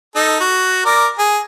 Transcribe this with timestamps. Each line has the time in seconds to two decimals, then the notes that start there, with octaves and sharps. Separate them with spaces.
0.16 D#4 A4
0.41 F#4
0.86 A#4 D5
1.19 G#4